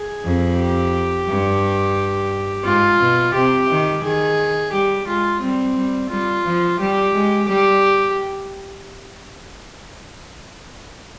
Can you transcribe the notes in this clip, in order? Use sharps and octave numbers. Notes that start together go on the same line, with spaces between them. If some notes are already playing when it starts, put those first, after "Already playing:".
Already playing: G#4
F2
G4
G2
G#2 F4
B2
C3 G4
D#3
D#3 G#4
G3 G4
G#3 F4
G3 C4
G3
G3 F4
F3
G3 G4
G#3
G3 G4